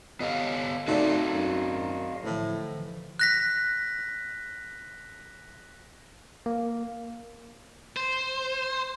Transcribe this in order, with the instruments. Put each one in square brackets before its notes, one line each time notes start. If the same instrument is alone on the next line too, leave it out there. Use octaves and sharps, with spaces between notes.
[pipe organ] D3 [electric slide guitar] B3 G4 F5 [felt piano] D#5
[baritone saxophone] A3 [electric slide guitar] C4 F#4 G#4 [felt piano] D#4 D5 [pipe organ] D#5 F5
[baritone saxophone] F#2
[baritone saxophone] A2 [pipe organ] D3 E3 F3
[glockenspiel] F#6 A#6 B6
[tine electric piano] A#3
[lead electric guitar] C5